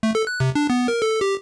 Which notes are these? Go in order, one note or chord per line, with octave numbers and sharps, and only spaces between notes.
A3
A4
F#6
C3
D4
B3
A#4
A4
G4